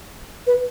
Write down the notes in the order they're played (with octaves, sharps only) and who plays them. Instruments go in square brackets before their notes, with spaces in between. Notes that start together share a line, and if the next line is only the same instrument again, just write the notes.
[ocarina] B4